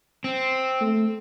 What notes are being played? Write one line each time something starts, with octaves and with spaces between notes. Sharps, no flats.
C4
A3